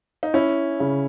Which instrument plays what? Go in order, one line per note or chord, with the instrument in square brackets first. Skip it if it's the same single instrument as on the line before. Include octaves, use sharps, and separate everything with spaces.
[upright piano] D#4
[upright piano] C#4 [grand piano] E4
[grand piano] C#3